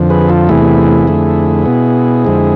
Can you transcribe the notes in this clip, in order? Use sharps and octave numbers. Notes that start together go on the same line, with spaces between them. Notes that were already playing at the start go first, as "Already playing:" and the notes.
Already playing: F2 D3 F3
G#4 B4
F4 A4
E2 C3 E3 A3 E4 G#4
F2 D3 A3
B2 B3
F2 D3 G#3 C4